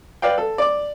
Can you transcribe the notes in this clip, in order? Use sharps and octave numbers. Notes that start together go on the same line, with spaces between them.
B4 D5 F5 G5
A4
D5 D6